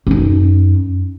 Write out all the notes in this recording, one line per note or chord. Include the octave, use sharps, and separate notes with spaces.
F#2 D#4